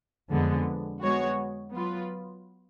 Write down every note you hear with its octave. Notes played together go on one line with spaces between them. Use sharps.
F2 D3 G#3 B3
G#3 B3 F#4 C#5
F#3 B3 F4 B4